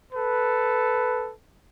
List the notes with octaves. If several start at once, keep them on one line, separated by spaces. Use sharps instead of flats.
A4 B4